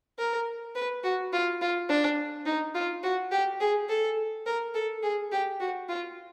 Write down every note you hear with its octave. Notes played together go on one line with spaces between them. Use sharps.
A#4
B4
F#4
F4
F4
D4
D#4
F4
F#4
G4
G#4
A4
A#4
A4
G#4
G4
F#4
F4